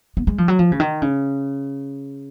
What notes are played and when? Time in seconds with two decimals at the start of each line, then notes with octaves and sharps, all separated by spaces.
0.17 B3
0.27 G#3
0.38 F3
0.48 F#3
0.59 F3
0.72 C#3
0.80 D#3
1.02 C#3